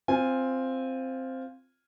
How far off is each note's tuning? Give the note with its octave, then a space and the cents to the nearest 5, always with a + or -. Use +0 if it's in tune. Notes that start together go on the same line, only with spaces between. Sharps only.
C4 +0 F4 +0 G#5 -15